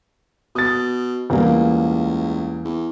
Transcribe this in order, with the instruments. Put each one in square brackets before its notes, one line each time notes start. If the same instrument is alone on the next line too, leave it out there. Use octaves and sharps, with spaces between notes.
[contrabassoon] B2 [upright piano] D#6 A6
[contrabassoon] E1 [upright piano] E2 G3 A#3
[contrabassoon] C#2
E2